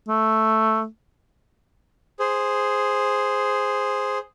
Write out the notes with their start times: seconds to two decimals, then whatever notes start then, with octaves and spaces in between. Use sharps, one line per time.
0.08 A3
2.19 G#4 C5